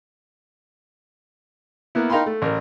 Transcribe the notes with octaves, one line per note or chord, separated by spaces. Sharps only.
A#3 B3 E4
D#4 A#4 F5 G5 B5 C6
A3
A1 A#4